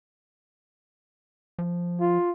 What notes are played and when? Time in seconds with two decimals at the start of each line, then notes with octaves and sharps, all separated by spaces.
1.59 F3
2.00 F4